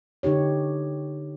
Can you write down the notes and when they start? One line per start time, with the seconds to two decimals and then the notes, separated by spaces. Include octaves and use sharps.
0.23 D3 D#4 G4 C#5